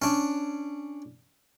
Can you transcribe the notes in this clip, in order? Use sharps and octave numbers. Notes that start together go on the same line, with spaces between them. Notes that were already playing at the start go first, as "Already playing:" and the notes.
C#4 D4